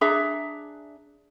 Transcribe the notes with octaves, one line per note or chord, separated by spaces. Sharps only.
D4 G#4 E5 A#5